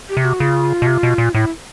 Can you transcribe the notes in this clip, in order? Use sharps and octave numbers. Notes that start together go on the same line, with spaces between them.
G4
C3
F#4
C#3 F4
B2
C3
B2
A#2
A2 E4